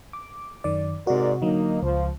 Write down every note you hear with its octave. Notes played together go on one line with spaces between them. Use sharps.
D6
F#2 D#3 D5
G#2 C3 F#4 A#4 D5
D3 F#3 A#3 D#4
C#2 F3